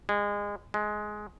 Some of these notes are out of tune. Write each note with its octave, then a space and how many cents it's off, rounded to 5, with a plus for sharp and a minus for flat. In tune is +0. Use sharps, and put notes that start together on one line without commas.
G#3 -25
G#3 +15